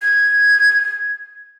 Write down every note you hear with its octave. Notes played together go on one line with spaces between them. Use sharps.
G#6